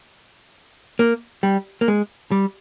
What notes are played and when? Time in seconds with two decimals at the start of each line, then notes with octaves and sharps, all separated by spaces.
0.99 A#3
1.43 G3
1.81 A#3
1.88 G#3
2.31 G3